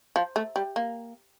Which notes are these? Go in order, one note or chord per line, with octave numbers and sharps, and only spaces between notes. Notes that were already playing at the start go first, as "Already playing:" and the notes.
F3
A3
G3
A#3